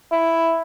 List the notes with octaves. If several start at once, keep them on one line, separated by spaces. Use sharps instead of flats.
E4